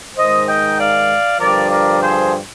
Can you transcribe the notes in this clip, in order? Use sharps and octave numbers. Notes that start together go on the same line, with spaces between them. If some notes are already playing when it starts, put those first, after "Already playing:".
G#2 D#3 C5 D#5
D#5 G5
D5 F5
G2 D3 F3 A#4 D5
A#4 D5
G#4 C5